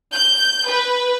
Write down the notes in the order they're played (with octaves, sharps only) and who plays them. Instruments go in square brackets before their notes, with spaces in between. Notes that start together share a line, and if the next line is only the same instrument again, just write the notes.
[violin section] G6
B4